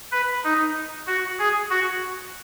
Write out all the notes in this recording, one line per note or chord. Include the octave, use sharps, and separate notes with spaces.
B4
D#4
F#4
G#4
F#4